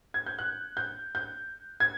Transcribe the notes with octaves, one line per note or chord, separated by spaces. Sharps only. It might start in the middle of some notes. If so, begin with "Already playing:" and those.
G#6
G6
F#6
G6
G6
G#6